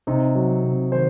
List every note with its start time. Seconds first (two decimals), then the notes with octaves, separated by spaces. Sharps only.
0.07 C3 D#4
0.35 F#3
0.64 C3
0.92 D#3 C5